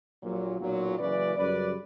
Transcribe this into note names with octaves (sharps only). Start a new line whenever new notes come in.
A#1 A#2 F#3
B1 A#2 F#3
F#1 F#2 C#3 E3 B4 D5
F#2 C#3 G3 B4 D5